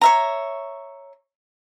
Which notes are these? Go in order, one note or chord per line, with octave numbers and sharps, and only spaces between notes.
C#5 E5 A#5